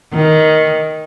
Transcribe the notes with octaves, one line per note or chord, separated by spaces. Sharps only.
D#3